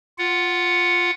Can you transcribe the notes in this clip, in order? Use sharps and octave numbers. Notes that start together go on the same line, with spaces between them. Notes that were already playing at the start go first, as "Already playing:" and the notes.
F4 F#5